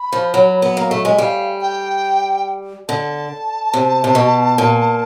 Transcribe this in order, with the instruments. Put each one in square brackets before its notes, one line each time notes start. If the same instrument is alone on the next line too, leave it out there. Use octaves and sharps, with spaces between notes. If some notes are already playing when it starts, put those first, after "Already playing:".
Already playing: [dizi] B5
[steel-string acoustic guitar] F3
F#3
B3
A#3
A3
[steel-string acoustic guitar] G#3 [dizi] E5
[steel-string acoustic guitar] G3 [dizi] F5
[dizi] G5
[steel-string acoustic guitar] D3 [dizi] A5
[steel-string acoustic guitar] C3
C3
B2
A#2